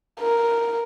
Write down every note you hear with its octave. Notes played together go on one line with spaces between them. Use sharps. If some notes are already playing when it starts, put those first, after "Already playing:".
A#4